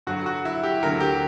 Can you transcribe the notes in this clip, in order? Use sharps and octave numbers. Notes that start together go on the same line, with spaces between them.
G2 D3 F#3 F#4
F#4
E4
G4
D2 D3 F#3 A#4
G4